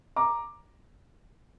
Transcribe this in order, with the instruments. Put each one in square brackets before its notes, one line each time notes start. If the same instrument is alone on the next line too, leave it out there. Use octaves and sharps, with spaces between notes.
[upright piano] A#5 D6